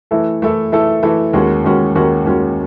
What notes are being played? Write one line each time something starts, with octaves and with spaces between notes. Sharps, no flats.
E3 A3 E4 A4
E3 A3 E4 A4
E3 A3 E4 A4
E3 A3 E4 A4
D#2 D#3 G#3 C#4 F#4
D#2 D#3 G#3 C#4 F#4
D#2 D#3 G#3 C#4 F#4
D#2 D#3 G#3 C#4 F#4